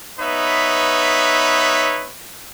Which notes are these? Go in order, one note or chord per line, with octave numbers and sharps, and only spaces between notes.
B3 D#4 B4 C#5 E5